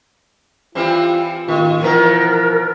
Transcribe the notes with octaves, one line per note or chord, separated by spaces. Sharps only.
E3 G3 C4 F4
A1 A#2 D#3 F4
B2 E3 F3 B3 A#4